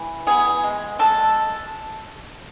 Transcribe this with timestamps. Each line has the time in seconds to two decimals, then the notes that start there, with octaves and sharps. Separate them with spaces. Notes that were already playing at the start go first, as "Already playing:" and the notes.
Already playing: E3
0.27 B3 G#4
0.64 G#3
0.99 G#3 A4